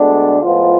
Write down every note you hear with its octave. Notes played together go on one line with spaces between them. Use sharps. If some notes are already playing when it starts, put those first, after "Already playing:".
Already playing: D2 D3 G#3 B3 D4
A2 F3 G#3 B3 F4